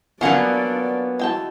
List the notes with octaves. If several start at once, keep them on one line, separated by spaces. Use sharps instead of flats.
F#3 A#3 B3 C#4 D4 F4 D5 F#5
G#3 E4 F#4 G5 A5